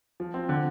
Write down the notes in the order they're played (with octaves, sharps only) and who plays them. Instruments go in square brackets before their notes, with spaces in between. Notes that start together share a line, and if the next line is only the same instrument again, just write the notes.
[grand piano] F3
C4
D3